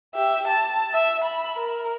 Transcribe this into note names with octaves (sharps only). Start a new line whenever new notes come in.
G4 E5
A5
E5
B5
A#4